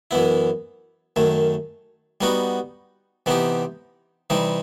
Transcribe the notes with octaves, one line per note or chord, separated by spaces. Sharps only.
F#2 E3 B3 E4
F#2 D#3 A3
G3 B3 D#4 F#4
C3 E3 B3 D#4 G4
C3 E3 G3 D#4